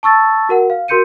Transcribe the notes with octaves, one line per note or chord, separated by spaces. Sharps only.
A5 C#6 E6 A6
F#4 A#4 F#5
F5
F#4 A#4 C6 G6 C#7 D#7